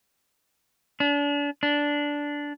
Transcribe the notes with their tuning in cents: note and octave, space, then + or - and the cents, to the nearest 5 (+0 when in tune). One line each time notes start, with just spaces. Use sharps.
D4 -35
D4 -10